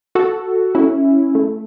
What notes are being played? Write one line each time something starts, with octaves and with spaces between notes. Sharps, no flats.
F#4 A4
C#4 E4
A3